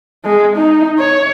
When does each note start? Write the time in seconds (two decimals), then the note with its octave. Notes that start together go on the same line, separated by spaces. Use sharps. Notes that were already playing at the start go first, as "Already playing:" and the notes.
0.24 G#3
0.56 D#4
0.98 C#5